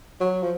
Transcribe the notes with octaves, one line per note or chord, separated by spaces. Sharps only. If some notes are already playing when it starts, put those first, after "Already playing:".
F#3
F3